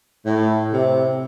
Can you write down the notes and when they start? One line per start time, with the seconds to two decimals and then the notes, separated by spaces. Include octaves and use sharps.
0.26 A2
0.73 C3